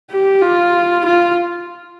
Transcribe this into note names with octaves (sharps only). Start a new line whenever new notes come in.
G4
F4
F4